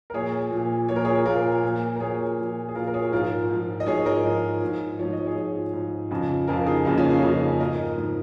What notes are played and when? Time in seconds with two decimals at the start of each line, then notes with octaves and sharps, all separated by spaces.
0.10 A#4
0.13 A#2 F3 G#4 C#5
0.51 A#2 F3
0.89 A#2 F3 C#5
0.96 A#4
1.05 G#4 C#5
1.25 A#2 F3 F4 A#4
1.63 A#2 F3
1.96 A#4
2.00 A#2 F3 G#4 C#5
2.38 A#2 F3
2.68 G#4
2.75 A#2 F3 F4 A#4
2.87 A#4
2.94 G#4 C#5
3.12 G#2 F3 F4 A#4
3.49 G#2 F3
3.80 D#5
3.86 G#2 F3 G#4 C#5
4.05 A#4 D#5
4.24 G#2 F3
4.61 G#2 F3
4.99 G#2 F3 C#5
5.13 D#5
5.26 G#4 C#5
5.36 G#2 F3
5.73 G#2 F3
6.11 F2 C#3 F3
6.48 F2 C#3 F3 F4 A#4
6.66 D#4 G#4
6.85 F2 C#3 F3 A#3 D#4
6.98 C#4 F4
7.10 D#4 G#4
7.22 F2 C#3 F3 D#4 G#4
7.60 G#2 F3 A#4 D#5
7.97 G#2 F3